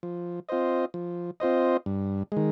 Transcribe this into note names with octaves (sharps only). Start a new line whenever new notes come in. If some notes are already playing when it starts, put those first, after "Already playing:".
F3
C4 F4 C5 D#5
F3
C4 F4 C5 D#5
G2
D#3 G#3